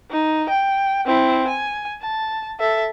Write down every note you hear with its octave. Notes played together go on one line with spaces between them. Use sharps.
D#4
G5
C4 E4
G#5
A5
A4 E5